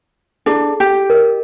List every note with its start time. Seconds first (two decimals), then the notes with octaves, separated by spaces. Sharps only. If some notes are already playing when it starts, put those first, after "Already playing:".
0.46 D4 E4 G#4 A4
0.80 G4
1.10 A#4 D#5